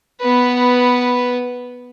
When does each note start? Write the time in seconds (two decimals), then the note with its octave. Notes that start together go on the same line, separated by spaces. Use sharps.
0.21 B3 B4